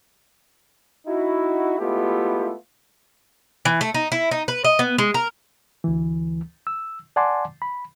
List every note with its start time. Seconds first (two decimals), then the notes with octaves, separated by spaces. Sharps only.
1.07 D#4 E4 F#4
1.79 G#3 A3 B3 E4 F4 G4
3.65 E3
3.81 A3
3.94 D#4
4.12 E4
4.31 D#4
4.48 B4
4.64 D#5
4.79 B3
4.98 G#3
5.14 A#4
5.84 D2 E3
6.67 E6
7.16 D5 F#5 G#5 A5 C6 D6
7.62 B5